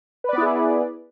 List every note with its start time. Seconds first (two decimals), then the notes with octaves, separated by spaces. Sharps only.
0.24 B4
0.29 D5
0.33 B3
0.38 E4
0.42 G#4